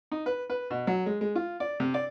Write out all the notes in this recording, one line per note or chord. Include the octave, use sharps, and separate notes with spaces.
D#4
B4
B4
B2
F#3
G#3
G#3
F4
D5
C3
D5